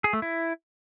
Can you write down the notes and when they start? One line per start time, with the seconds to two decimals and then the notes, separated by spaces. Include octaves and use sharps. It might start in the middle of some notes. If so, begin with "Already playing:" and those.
0.04 G#4
0.13 A3
0.22 E4